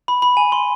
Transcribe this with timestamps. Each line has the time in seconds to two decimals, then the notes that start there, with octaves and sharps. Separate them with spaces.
0.08 B5
0.22 B5
0.37 G#5
0.52 C6